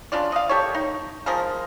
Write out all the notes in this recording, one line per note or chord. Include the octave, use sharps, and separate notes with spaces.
C#3 D4 F4 D5
D#5 F5
G4 A4 A#4 C#5
D#4
F3 G#3 A#4